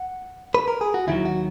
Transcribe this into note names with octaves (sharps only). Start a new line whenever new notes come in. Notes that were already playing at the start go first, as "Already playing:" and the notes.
Already playing: F#5
B4
A#4
G#4
F#4
D#2 D#3 F#3 E4
F#4